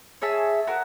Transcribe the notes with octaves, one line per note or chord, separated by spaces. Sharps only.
G#4 C#5 E5 A5
F#4 A#4